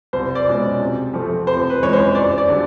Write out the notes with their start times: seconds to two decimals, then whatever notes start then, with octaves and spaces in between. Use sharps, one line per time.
0.13 C2 C5
0.35 D5
0.46 B2 G#3 C#4
0.80 C3
1.14 F3 A3 C4
1.47 C3 C5
1.70 B4
1.81 E3 G#3 C#4 C#5
1.93 C5
2.15 F#2 D5
2.38 D5
2.49 D3 G3